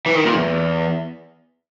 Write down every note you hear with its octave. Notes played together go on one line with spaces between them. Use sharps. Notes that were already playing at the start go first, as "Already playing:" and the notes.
E3
D#3
A#2
E2